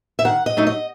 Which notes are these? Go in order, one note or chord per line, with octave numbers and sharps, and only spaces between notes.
E5
D#3 F#5
D#5
F#3 A3 D#4
D#5